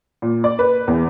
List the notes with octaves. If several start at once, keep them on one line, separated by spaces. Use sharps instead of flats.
A#2
D5
B4
E2